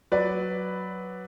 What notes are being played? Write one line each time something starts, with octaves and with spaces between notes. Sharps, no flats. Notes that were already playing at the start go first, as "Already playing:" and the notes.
F#3 B4 D5